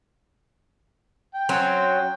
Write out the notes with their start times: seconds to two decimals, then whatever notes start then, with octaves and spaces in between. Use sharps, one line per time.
1.34 G5
1.49 F#3 C4 C#4